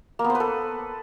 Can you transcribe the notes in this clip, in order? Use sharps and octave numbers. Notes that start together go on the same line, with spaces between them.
A#3
B3
C5
B4
A4